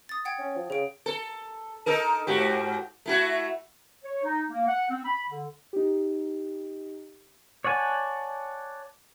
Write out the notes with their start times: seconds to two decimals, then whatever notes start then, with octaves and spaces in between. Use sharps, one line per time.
0.09 D#6 A6
0.25 F#5 G5 G#6
0.39 C#4
0.56 F3
0.70 C#3 G#4 D7
1.06 A4
1.86 D#4 A4 A#4
2.27 G#2 F#4 G4
3.06 A3 E4 F#4
4.04 C#5
4.23 D#4
4.50 A#3
4.67 F#5
4.89 C4
5.04 B5
5.28 D3
5.73 D#4 G4
7.64 C#5 D5 F#5 G#5 A5